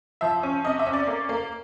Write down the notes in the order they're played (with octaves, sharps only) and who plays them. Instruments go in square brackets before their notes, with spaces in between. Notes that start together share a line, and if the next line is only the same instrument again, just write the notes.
[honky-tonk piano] F3 E5
C#4
C3 D#5
E5
C#4
D5
A#3
A#3